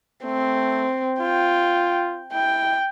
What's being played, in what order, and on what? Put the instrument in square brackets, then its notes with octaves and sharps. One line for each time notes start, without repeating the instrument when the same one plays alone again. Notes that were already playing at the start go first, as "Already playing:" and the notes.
[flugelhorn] A3 [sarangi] C4
[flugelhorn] F4 [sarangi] G5
[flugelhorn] E4 [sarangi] G5